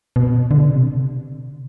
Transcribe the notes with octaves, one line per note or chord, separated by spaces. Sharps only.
B2
D3
C3